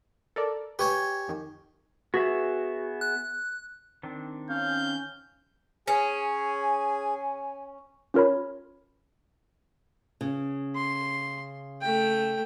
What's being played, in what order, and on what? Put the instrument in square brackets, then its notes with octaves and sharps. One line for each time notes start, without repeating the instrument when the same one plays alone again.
[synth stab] A4 A#4 D5
[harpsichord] G4 C#5 G#5 [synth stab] B4
[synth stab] F2 D#3
[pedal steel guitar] B3 G#4 E5 [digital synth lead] F#4
[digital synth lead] F#6
[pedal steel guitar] D#3 C4 D4
[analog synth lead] C#4 [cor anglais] F5 [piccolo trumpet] G6
[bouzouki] C#4 [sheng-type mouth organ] G#4 [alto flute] G#5
[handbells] C#4 F4 A#4 C#5 B5
[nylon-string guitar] C#3
[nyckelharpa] C6
A3 G5